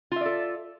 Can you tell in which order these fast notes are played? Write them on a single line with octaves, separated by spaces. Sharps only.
F4 E5 D5 A4